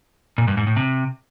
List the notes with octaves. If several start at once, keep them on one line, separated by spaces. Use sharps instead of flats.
A#2
G2
G#2
A2
C3